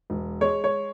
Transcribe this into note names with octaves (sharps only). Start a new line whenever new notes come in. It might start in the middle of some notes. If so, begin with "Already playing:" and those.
E1
G#3 C#5
C#5